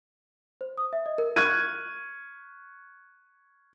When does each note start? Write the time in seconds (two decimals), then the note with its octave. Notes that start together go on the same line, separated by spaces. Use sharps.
0.61 C5
0.78 D#6
0.93 E5
1.06 D#5
1.18 A#4
1.36 C#6 F6 F#6 G#6 D#7